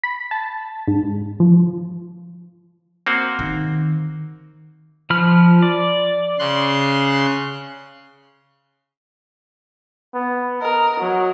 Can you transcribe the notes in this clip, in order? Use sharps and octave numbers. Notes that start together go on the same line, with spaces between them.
B5
A5
G#2
F3
A#3 C4 F#4
D#3
F3 B5 F6
D5
C#3 C6 F#6
B3
A#4 D#5
F#3